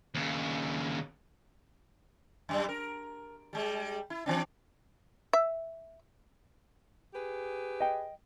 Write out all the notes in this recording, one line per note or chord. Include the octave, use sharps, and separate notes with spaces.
D#2 C#3
F#2 G3
A#4
G3 G#3
E4
E3 C4 D4
E5
G4 G#4 B4
D#5 G5